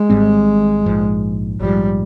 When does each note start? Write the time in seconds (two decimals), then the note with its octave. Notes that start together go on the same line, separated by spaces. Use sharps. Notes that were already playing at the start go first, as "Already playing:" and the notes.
Already playing: G#3
0.09 G#1 G#2 G3 C4
0.86 A#1 G#2 F3
1.60 A#1 G#2 F3 G3